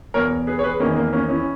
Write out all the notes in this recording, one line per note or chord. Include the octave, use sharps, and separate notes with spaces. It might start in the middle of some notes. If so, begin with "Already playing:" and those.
E2 B2 A#4 C#5
G#4 B4
C#5
G#4 B4
E2 D#3 A#3 C#4
A#3
A#3 C#4
C#4 E4